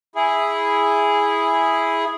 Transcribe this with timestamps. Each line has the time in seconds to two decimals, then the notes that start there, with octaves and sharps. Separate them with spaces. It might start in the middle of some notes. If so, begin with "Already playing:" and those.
0.15 E4 G#4